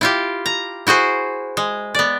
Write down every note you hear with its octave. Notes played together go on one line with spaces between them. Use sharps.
E4 F4 G4
A#5
E4 F#4 G#4 C5
G#3
B3 D5